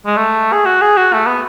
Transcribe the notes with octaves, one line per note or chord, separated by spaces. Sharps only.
G#3
A3
G#4
F#4
G#4
F#4
A3
B3